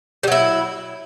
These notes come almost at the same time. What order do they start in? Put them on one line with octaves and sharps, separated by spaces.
G3 F#3 E4